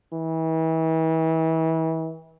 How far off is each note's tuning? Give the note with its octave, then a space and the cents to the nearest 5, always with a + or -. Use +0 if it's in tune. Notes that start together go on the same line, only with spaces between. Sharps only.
E3 -35